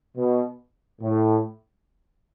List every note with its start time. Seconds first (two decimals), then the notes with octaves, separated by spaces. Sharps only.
0.17 B2
1.01 A2